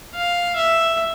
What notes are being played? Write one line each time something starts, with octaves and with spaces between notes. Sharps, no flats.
F5
E5